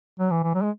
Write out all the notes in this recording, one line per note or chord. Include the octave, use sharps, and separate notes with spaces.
F#3
E3
E3
F#3
G#3